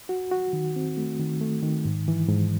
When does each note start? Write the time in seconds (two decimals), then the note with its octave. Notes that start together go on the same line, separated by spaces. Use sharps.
0.09 F#4
0.32 F#4
0.53 D#3
0.76 C4
0.97 A3
1.20 D#3
1.41 A3
1.63 D#3
1.85 G#2
2.08 E3
2.29 G#2